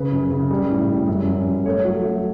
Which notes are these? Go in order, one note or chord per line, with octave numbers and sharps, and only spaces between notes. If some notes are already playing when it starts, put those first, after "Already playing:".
Already playing: C#3 B4
F#2
C#3
G3
A2
G3
F#2
F#2
F#2
A3 C#5
F#3
A3